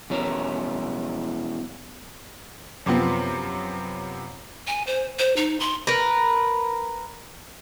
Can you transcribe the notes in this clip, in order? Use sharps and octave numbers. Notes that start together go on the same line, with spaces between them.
E2 B2 C#4 A#4
F#2 C3 F3 B3 C4
G#5
C5
C5
D#4
C6
A#4 B4